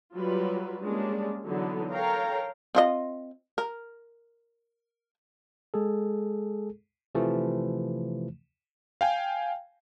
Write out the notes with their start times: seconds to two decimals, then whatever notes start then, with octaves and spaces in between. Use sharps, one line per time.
0.15 F#3 G3 F4 B4
0.81 G3 G#3 A#3 C#4 D4
1.46 D3 E3 F#3 B3 D#4
1.92 A4 A#4 C#5 F5 G5 A#5
2.75 C4 F4 D#5
3.58 A#4
5.74 G#3 G#4 A4
7.15 C3 E3 F3 A3
9.01 F5 G5 G#5